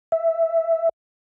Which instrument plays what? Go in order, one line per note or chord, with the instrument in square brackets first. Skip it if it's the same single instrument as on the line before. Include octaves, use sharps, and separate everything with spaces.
[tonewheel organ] E5